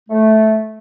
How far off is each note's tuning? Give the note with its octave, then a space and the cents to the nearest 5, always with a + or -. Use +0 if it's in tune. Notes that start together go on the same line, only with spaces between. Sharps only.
A3 -10